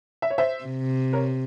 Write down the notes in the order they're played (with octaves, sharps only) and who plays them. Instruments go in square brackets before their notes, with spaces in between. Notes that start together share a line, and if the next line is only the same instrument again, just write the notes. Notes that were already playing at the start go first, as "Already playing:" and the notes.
[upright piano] E5
C#5
C5 E5
[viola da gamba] C3
[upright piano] A#4 C#5